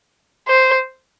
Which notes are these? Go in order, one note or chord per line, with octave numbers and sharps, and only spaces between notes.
C5